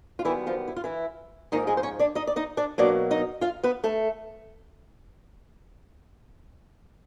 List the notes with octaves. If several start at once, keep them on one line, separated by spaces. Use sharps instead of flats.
F4
F#2 D#3 E3 G3 B3 E4
F3 F4
E4
F4
E3 E4
G#2 D#3 F3 A#3 D#4
G#3 G#4
C5
C#4 C#5
D4 D5
D#4 D#5
D5
D#4 D#5
D4 D5
B2 F#3 A#3 D4 D5
D#4 D#5
F4 F5
B3 B4
A3 A4